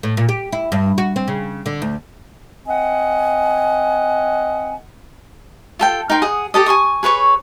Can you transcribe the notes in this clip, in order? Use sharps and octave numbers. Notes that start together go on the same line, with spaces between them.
A2
A#2
G4
E4
G2
F#4
C4
C#3
D3
D2
C4 D#5 F#5 G#5
F4 A4 G5
D#4 A#4 G5 C6
G#4 F#5 D#6
G4 A4 D#5
G#5 C6 C#6 D#6
G#4 B4 C#5 C#6